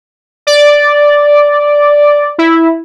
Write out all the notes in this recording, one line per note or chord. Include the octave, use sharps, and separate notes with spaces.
D5
E4